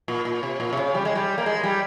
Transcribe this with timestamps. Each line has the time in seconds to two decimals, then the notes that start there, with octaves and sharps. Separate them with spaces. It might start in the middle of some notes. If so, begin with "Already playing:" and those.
0.08 A#2
0.25 A#2
0.43 C3
0.60 A#2
0.73 C3
0.77 C#3
0.94 G3
1.05 G#3
1.15 G3
1.38 A#3
1.46 G#3
1.63 G3